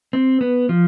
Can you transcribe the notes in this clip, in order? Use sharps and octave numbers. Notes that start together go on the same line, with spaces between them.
C4
B3
F3